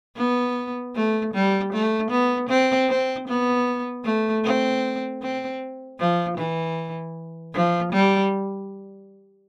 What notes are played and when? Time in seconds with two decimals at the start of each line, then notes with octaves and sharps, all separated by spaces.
0.17 B3
0.95 A3
1.34 G3
1.73 A3
2.11 B3
2.49 C4
2.89 C4
3.28 B3
4.05 A3
4.44 C4
5.22 C4
5.99 F3
6.38 E3
7.54 F3
7.93 G3